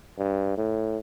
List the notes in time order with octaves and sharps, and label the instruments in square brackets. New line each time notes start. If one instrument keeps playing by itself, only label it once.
[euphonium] G2
A2